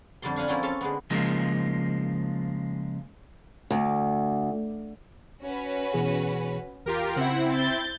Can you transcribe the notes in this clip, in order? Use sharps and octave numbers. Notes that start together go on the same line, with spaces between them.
F2 D3 G3 D5 C6
D4 F5 F#5 G#5 B5
F3 A#3 C4 C#4 E4 F4
C#4 A4 E5 F5 A5
D3 G#3 B3
C#3 F3 G#3 A#3
D2
C#4 F#4 B4
B2 E3 G#4
E2 F4 G4 A#4
C#3 C4 E4 F#5
G6 A6